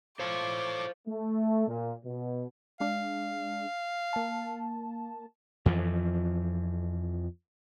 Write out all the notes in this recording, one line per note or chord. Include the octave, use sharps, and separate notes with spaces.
A4 C5 C#5 F5 D6
A3
A#2
B2
G#3 D4 F5
A#3 A5
F2 E3 F3